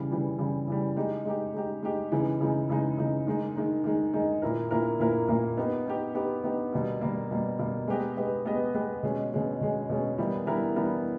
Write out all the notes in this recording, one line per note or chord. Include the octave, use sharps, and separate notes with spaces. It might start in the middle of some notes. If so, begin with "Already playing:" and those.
Already playing: C#3 E3 G3
C#3 E3 G3
C#3 E3 G3
C#3 E3 G3
G#3 D#4 G4
G#3 D#4 G4
G#3 D#4 G4
G#3 D#4 G4
C#3 E3 G#3 D#4
C#3 E3 G#3 D#4
C#3 E3 G#3 D#4
C#3 E3 G#3 D#4
D#3 G#3 D#4
D#3 G#3 D#4
D#3 G#3 D#4
D#3 G#3 D#4
A#2 A#3 E4 A#4
A#2 A#3 E4 A#4
A#2 A#3 E4 A#4
A#2 A#3 E4 A#4
B3 D#4 G4
B3 D#4 G4
B3 D#4 G4
B3 D#4 G4
B2 G3 A#3
B2 G3 A#3
B2 G3 A#3
B2 G3 A#3
G#3 B3 G4 B4 D#5
G#3 B3 G4 B4 D#5
G#3 B3 G4 B4 D#5
G#3 B3 G4 B4 D#5
B2 G#3 C#4
B2 G#3 C#4
B2 G#3 C#4
B2 G#3 C#4
E3 G3 B3 E4 A#4
E3 G3 B3 E4 A#4
E3 G3 B3 E4 A#4